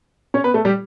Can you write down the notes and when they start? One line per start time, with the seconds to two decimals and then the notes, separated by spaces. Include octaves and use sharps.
0.34 C#4 C#5
0.44 B3 B4
0.54 A3 A4
0.65 G3 G4